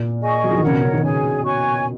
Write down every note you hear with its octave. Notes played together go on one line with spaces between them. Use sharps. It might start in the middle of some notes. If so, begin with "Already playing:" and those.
Already playing: A#2
G#4 D#5 G#5 C#6
F#3
F3
D#3
C#3 A#4 C#5 F#5
B2
C#3
D#3
C#3 G#4 C#5 G#5
F#4 C#5 G#5 C#6